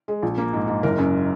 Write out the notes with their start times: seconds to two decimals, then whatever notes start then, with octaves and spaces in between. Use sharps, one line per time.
0.08 G#3
0.22 A#1
0.38 A#3
0.53 G#2
0.68 G#2
0.83 F#1 A#4
0.98 F#2